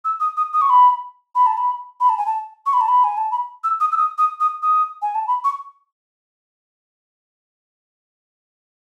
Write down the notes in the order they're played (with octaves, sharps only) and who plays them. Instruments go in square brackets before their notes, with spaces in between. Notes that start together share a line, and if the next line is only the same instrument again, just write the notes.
[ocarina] E6
D#6
D#6
D#6
C#6
B5
B5
A5
B5
B5
A5
G#5
A5
C#6
B5
A5
B5
G#5
A5
B5
E6
D#6
E6
D#6
D#6
D#6
D#6
G#5
A5
B5
C#6